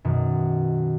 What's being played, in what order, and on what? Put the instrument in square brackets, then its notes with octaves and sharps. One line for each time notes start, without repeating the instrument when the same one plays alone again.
[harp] F#2 B2 D#3